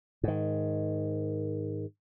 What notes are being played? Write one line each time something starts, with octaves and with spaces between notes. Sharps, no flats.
G#2 D#3